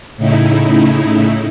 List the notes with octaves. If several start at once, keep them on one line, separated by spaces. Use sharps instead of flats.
A2 C#3 D#4 E4